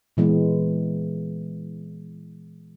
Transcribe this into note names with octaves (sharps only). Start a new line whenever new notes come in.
A#2 E3 G#3 B3